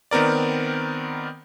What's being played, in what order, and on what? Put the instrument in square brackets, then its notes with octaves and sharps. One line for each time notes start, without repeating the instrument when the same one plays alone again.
[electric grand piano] D#3 B3 C4 A#4 D5